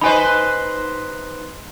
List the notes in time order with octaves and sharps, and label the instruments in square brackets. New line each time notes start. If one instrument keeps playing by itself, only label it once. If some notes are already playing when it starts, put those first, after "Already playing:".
[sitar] D#4 B4 C5 [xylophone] D#5 G#5 B5